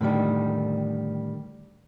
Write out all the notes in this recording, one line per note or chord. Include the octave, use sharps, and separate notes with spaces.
A2 D3 D#3 G3